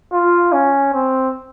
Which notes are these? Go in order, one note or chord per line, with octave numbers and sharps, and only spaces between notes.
F4
C#4
C4